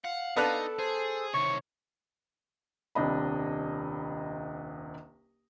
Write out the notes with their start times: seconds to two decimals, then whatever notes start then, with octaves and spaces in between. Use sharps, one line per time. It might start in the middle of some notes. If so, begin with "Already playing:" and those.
0.05 F5 F#5
0.36 B3 D4 D#4 A4 F#6
0.79 G#4 C5
1.34 C3 D#3 C#5 C#6
2.95 D#1 C2 D4 D#5 B5